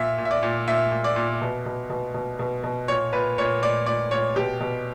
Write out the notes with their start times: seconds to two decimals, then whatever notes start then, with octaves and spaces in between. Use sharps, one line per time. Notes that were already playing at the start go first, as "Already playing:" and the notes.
Already playing: A#2 E5
0.18 A#2
0.25 E5
0.31 D5
0.43 A#2
0.68 A#2 E5
0.92 A#2
1.04 D5
1.16 A#2
1.41 B2
1.66 B2
1.90 B2
2.14 B2
2.39 B2
2.64 B2
2.88 A#2 C#5
3.13 A#2 B4
3.38 A#2 C#5
3.62 A#2 D5
3.86 A#2 D5
4.11 A#2 C#5
4.36 B2 G4
4.60 B2